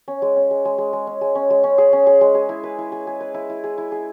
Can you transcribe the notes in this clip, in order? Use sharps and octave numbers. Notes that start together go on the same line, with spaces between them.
C#4
G#3
C#4
G#3
G#3
G#3
G#3
C#4
G#3
C#4
G#3
C#4
G#4
C#4
G#4
G#3
G#4
E4
B4
E4
G#4
G#4
B4
E4
E4
G#4
E4
G#4